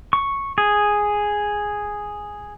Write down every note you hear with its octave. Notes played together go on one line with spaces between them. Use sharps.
C#6
G#4